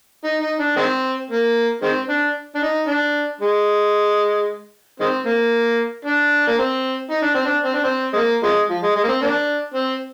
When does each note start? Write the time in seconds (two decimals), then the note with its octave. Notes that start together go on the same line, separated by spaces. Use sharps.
0.24 D#4
0.42 D#4
0.59 D4
0.76 D#3 G#3 C4
1.30 A#3
1.82 D#3 G#3 C4
2.09 D4
2.55 D4
2.62 D#4
2.88 D4
3.41 G#3
5.00 D#3 G#3 C4
5.26 A#3
6.05 D4
6.47 A#3
6.58 C4
7.11 D#4
7.22 D4
7.34 C4
7.45 D4
7.64 C4
7.74 D4
7.84 C4
8.13 G#3
8.16 A#3
8.43 C3 F3 G#3
8.70 F3
8.83 G#3
8.96 G#3
9.03 A#3
9.08 C4
9.21 A#3 D4
9.74 C4